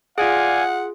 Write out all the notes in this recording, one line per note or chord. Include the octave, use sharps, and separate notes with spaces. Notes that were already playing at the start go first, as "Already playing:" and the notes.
F4 G#4 D5 F5 F#5 G#5